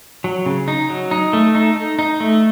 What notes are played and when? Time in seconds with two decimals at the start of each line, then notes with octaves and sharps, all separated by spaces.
0.24 F#3
0.46 C#3
0.68 D#4
0.89 F#3
1.11 D#4
1.33 A3
1.55 D#4
1.76 D#4
1.99 D#4
2.20 A3